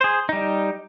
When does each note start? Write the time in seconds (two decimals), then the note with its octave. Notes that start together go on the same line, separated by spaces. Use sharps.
0.01 G#4 C5
0.29 G3 D#4